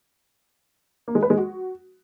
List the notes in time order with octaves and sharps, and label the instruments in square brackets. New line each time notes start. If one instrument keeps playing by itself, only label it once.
[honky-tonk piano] A#3
G#3
B4
G#3
F#4